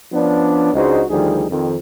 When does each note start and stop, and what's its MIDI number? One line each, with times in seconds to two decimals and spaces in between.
0.13 0.73 53
0.13 0.73 59
0.13 0.73 61
0.13 0.73 62
0.74 1.02 37
0.74 1.02 56
0.74 1.02 62
0.74 1.02 63
0.74 1.02 66
0.74 1.02 72
1.10 1.44 38
1.10 1.44 51
1.10 1.44 53
1.10 1.44 55
1.10 1.44 63
1.10 1.44 68
1.50 1.76 41
1.50 1.76 51